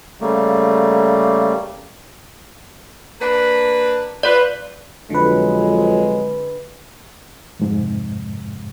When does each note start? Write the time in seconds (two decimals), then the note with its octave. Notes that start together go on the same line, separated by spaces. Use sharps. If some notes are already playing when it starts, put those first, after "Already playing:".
0.21 C#3 G3 A3 A#3
3.20 A#3 D4 B4
4.23 F4 B4 D5
5.10 F2 D3 F#3 G#3 B4
7.60 F2 G#2 C3